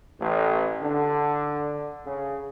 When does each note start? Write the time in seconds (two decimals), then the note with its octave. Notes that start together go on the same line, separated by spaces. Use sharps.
0.19 A1
0.83 D3
2.07 C#3